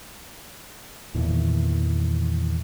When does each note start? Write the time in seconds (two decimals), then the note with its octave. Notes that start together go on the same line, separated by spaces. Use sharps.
1.14 E2 A#2 D#3 E3